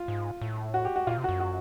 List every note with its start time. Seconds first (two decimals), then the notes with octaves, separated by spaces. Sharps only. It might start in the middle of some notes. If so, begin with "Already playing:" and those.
Already playing: F4
0.08 G#2
0.42 A2
0.74 F#4
0.85 G4
0.96 F#4
1.07 A#2 F4
1.17 C3
1.24 F#4
1.29 F#2
1.40 F#4